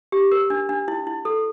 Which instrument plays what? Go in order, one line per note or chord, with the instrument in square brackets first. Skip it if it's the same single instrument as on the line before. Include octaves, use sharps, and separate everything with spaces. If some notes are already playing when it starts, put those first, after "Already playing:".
[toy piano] G4
A#4
D4
D4
E4
E4
A4